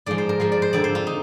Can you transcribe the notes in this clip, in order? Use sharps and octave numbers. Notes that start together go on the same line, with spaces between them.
G#2 F3 D5
C5
A#4
G#2 F3 C5
D5
C5
F2 D3 F3 D5
C5
F4
D#4